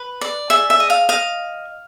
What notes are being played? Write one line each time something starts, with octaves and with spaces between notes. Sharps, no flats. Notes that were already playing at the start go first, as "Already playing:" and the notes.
Already playing: B4
D5
G#4 E5
E5
D#5
F5
D#5 F5